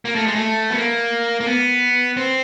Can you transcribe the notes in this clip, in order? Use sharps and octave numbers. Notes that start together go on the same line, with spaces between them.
A#3
A3
G#3
A3
B3
A#3
A#3
B3
C4